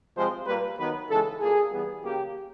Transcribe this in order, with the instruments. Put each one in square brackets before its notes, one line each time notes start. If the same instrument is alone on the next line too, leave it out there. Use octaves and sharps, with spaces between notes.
[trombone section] C3 F3 G#3 C4 C5
A#2 G3 A#3 B4
D#3 F#3 B3 B4
C#3 E3 G#3 A4
A#2 F#3 A#3 G#4
E3 G3 B3
C#3 F#3 A#3 G4